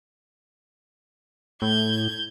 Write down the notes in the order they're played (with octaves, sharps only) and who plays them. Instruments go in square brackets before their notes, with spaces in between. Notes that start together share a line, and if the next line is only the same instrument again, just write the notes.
[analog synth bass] A2 [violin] G6 G#6